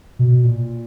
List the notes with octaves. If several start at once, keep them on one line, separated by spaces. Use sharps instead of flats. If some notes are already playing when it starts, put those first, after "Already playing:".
B2
A#2